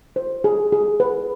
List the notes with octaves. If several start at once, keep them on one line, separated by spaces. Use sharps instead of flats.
C5
G#4
G#4
B4